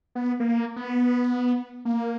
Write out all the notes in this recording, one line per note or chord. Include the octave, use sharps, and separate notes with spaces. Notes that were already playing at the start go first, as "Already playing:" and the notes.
B3
A#3
B3
A#3